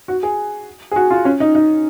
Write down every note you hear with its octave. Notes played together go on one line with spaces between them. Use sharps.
F#4
G#4
G#4
F#4
F4
C#4
D#4
D#4